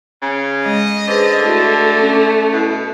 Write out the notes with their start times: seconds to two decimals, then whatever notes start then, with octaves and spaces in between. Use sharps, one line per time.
0.22 C#3
0.65 G#3 D#5
1.08 D3 G#4 B4 C5
1.43 A3 E4 F#4
2.00 C#4
2.53 B2 E4